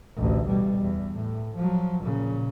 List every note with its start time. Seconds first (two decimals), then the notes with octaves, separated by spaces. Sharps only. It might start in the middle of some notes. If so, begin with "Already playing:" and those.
0.17 A1 D2
0.47 B2 G3
0.80 E2
1.15 A2
1.56 F3 F#3
2.03 A#2 C#3